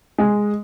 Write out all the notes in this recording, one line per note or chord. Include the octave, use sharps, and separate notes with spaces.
G#3